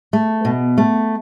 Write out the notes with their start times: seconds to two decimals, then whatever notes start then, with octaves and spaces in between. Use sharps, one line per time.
0.13 A3
0.45 B2
0.78 A3